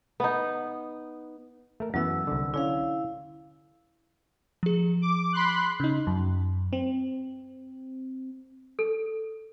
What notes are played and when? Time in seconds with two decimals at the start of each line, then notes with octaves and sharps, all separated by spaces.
0.20 B3 D#4
1.80 A3 A#4
1.94 F#2 E3 F#3 B3 E6
2.27 C2 D3
2.54 D3 C#4 E4 F5
4.63 F3 G#4
5.02 D6
5.33 B5 C6 F#6
5.80 C#3 D#4
6.07 F#2
6.73 C4
8.79 A4